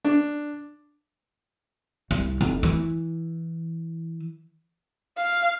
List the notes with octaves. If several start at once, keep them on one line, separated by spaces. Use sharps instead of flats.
D4
C2
F1
E3
F5